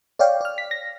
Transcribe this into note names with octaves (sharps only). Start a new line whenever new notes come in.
C#5 D5 F5 G5
D5 F6
B6
A#6